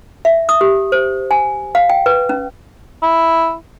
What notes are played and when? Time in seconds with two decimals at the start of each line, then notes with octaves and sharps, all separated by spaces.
0.25 E5
0.49 D#6
0.61 G4
0.92 C5
1.31 G#5
1.75 F5
1.90 G5
2.06 B4
2.29 C#4
3.03 E4